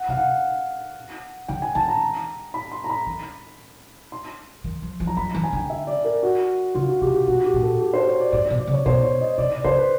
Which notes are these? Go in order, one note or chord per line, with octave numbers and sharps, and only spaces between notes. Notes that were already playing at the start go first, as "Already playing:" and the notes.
Already playing: F#5
C3 F5
F#5
D3 G5
G#5
D#3 A5
A#5
B5
C6
A#5
B5
D#3
C6
D#3
F3
F3
A#5
F3 B5
E3 A#5
G#5
D3 G5
E5
D5
A#4
F#4
C#3 F4
F#4
C3 G4
G4
B2 F#4
G4
A#2
A4
G4
C5
C#5
D5
A2 D5
B2 D5
D5
C#3
C#5
B2 C5
C#5
D#5
C3 D5
D5
C#3 C5
B4